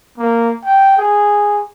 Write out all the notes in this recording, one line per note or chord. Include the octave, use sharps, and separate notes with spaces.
A#3
G5
G#4